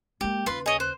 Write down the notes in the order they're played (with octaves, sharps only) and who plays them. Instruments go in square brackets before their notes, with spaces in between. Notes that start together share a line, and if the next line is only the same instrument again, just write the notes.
[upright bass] G#3 A#3 [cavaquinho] G4
[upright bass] D#2 C#3 [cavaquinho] F4 B4 C6
[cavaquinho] G#4 C#5 [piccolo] D#5
[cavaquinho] C5 [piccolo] F#6